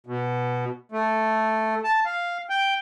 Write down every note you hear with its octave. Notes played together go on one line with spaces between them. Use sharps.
B2
A3
A5
F5
G5